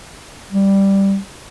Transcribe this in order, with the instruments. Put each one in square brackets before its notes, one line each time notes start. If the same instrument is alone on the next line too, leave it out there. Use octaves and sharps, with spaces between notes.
[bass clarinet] G3